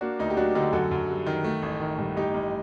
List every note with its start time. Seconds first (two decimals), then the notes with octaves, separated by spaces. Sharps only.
0.01 A#3 D4 F#4
0.19 D2 D#4
0.30 G4
0.37 F#3 D4 F#4
0.55 D3 D#4 G4
0.73 F#2 F#4 A4
0.91 F#2
1.10 G3
1.26 D#3
1.44 A3
1.62 A1
1.80 D#3
1.98 G2
2.16 A1 D#4 G4
2.34 A1